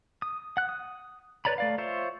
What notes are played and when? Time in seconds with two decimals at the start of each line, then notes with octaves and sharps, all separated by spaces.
0.22 D#6
0.57 F#5 F#6
0.69 D#6
1.45 B4 C#5 D5 A#5 B5
1.58 A3 D5 F5
1.78 F4 C5 C#5 E5